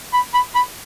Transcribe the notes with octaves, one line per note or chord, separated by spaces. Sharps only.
B5
B5
B5